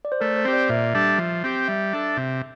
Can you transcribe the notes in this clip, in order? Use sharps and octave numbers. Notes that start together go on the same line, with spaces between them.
D5
C5
A3 A#4
C5
C4 G4
D5
A#2 E5
G3 D4 A4
F3
C4 G4
G3 E5
D4 A4
C3